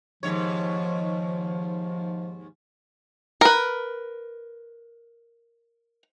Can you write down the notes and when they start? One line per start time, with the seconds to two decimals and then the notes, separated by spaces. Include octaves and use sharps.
0.23 D#2 G#2 F3 C#5
3.41 A#4 B4